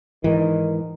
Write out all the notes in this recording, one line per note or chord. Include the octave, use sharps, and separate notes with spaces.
G#2 D#3 E3